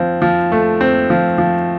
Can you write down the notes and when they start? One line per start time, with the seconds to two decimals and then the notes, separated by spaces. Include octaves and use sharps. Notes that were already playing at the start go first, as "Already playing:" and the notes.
Already playing: F3 C4
0.22 F3
0.52 A3
0.81 C4
1.10 F3
1.38 F3